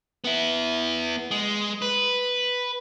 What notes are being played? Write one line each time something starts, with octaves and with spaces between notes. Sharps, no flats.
B3 E4
G#3
B4